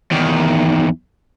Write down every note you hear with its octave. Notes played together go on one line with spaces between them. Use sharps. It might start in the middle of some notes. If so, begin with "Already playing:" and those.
E2 D#3